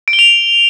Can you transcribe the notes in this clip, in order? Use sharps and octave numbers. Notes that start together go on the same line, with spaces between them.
D7
G7
F7